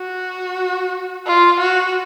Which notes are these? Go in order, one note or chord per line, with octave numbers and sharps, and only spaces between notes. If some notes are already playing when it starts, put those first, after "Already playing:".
Already playing: F#4
F4
F#4